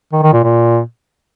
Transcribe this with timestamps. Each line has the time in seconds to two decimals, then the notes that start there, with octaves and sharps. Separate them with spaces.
0.13 D#3
0.23 D#3
0.33 A#2
0.44 A#2